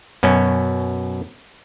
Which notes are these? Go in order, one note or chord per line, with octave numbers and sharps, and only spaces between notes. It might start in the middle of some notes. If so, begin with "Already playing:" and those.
F#2 B2 C#4